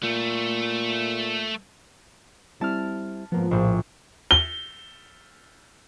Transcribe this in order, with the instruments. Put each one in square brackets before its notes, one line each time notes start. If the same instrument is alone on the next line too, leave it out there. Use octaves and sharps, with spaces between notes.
[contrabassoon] A#2 [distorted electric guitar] A3
[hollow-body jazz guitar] G3 C4 E4 [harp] A5 F6
[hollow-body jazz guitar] G#2 A#3 B3 [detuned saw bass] F3
[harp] A#1 A2 [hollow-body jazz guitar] G#4 A#4 C5
[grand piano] G7